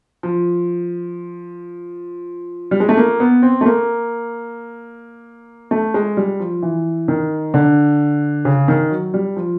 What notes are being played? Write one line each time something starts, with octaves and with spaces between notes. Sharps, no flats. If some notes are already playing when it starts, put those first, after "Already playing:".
F3
G3
G#3
A3
A#3
B3
C4
A3
A#3
A3
G#3
G3
F3
E3
D#3
D3
C#3
D#3
F#3
G3
F3